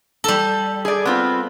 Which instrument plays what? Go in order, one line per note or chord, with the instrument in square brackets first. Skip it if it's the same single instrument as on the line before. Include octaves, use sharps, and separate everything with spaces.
[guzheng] G3 A4
[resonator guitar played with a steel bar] G#4 D5
B3 C4 F4